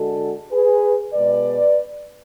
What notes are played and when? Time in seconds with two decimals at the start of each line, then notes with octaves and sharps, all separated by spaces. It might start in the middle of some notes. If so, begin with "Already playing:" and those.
Already playing: D3 G#3 F#4 A4
0.51 G#4 B4
1.14 B2 G#3 B4 D5